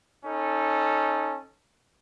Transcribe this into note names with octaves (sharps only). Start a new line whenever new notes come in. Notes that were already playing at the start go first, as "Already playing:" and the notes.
C#4 D#4 A4